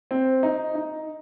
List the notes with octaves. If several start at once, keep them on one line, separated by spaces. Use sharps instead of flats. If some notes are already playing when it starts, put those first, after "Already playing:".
C4
D#4
D#4